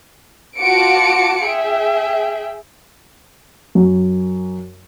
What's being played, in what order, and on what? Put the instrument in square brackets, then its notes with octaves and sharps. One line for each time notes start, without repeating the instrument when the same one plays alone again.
[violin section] F4 F#4 A5 D6 C#7 D7
G#4 E5 G5
[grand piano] F#2